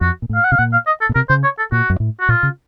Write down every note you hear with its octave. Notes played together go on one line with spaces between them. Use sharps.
F2 F#4
A#2
A2
F5
F#5
C3 F5
A#2 F#5
F5
D#5
A4
A#2
C3 A#4
C#3 C5
C#5
A4
A#2 F#4
F#2
A2
F#4
A#2 F4
C#3